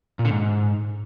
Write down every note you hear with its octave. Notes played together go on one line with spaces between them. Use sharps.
A#2
D3
G#2